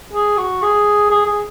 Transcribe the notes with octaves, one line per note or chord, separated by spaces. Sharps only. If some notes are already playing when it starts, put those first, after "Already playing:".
G#4
F#4
G#4
G#4
G#4